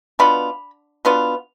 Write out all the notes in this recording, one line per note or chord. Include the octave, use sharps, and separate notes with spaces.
B2 B3 D4 F4 B5
B2 B3 D4 F4